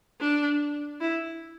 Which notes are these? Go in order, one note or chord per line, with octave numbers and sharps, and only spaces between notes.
D4
E4